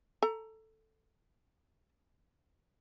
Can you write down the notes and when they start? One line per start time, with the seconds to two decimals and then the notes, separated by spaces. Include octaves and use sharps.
0.23 A4 A#5